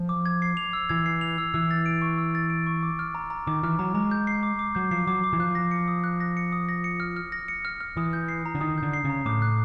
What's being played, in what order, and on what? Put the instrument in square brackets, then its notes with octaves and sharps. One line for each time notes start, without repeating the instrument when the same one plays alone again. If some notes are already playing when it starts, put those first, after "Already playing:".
Already playing: [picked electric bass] F3
[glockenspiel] D6
G#6
C7
F7
E6
[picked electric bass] E3 [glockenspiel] G#6
[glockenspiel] C7
F7
E6
[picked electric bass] E3 [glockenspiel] E6
[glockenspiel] A6
D7
C#6
E6
A6
D7
C#6
D6
F6
A#5
A#5
[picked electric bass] D#3 [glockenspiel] D6
[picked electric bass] E3 [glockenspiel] F6
[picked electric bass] F#3 [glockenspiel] A#5
[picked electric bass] G#3 [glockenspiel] A#5
[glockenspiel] G6
C7
D6
D6
[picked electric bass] F#3 [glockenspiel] G6
[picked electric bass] F3 [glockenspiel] C7
[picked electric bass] F#3 [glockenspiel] D6
[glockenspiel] D6
[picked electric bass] E3
[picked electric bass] F3 [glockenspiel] F#6
[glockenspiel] A#6
C#7
D#6
F#6
A#6
C#7
D#6
A#6
C#7
F6
F6
A#6
C#7
F6
F6
[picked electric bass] E3 [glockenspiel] D#6
[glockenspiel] G6
C7
A#5
[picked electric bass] D3
[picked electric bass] D#3 [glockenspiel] D#6
[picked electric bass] D3 [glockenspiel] G6
[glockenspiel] C7
[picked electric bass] C#3
[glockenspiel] A#5
[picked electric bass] A2 [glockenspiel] D6
[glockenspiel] F#6